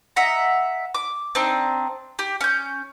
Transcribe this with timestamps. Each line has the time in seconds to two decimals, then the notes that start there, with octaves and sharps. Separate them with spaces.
0.16 D#5 E5 F#5 A#5
0.95 D6
1.35 C4 D4 D#4
2.19 G4
2.41 C#4 G6